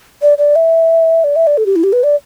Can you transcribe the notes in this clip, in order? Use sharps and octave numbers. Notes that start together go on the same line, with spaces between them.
D5
D5
E5
D5
E5
D5
A4
G4
E4
G4
B4
D5